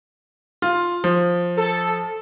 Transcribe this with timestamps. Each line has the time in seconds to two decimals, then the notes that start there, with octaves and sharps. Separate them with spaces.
0.62 F4
1.04 F3
1.58 A4